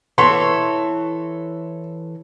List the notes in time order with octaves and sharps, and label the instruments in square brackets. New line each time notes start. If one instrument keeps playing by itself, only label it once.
[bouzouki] E3 A4 C#5 [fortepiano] C6